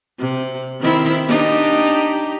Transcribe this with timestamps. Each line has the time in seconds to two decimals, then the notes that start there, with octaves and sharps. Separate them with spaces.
0.19 C3
0.81 D#3 C4 E4
1.28 D4 D#4 G4